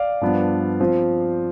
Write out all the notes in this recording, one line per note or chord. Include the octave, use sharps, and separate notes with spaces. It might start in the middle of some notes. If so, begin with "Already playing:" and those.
Already playing: D5 F5
G2 F3 B3 D4
F3 C4